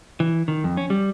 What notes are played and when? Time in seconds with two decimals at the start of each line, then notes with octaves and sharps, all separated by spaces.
0.20 E3
0.48 D#3
0.64 F2
0.77 C#4
0.90 G3